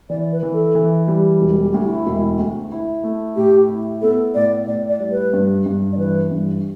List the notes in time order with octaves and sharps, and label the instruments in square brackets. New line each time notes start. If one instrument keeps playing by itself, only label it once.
[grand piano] E3 [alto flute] D5
[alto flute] B4
[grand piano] E3
[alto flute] A4
[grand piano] E3
G3
[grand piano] E1 [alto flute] E4
[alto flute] G4
[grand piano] D2
[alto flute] E4
[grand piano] E1
D2
E4
A3
[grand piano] A2 [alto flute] G4
[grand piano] E4
[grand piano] B3 [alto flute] A4
[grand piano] A2 [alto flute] D5
[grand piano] A2 [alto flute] D5
[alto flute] D5
[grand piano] G3
[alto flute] B4
[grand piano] G2
G2
[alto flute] D5
[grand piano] E3 [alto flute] B4
[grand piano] G2